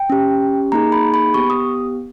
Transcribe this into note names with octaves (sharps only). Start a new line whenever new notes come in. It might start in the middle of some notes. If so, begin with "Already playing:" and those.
Already playing: G5
C#4 G4
A#3 D#4 G#4 A#5
B5
B5
B3 G4 C#6
D#6